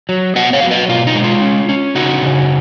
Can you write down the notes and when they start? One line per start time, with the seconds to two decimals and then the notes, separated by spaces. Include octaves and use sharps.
0.09 F#3
0.36 B3 D#5 F#5
0.53 C#5 F5
0.63 F#3
0.71 B4 D#5
0.89 B2 F4
1.07 D#4
1.15 G#3
1.24 F4
1.42 C#4
1.69 C#4
1.95 C#3 D#4 F#4
2.22 C#3